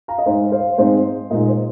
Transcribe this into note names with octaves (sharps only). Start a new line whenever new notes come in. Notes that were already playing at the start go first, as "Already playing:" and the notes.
F5 A#5
D#5
G#2 G#3 D#4 C5
C5 F5
G#2 G#3 C4 D#4 C5
A#2 G#3 D#4 A#4 D#5
C5